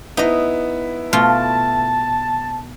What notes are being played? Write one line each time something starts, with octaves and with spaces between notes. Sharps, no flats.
B3 D#4 E4 D#5 E5
B2 A3 F4 A5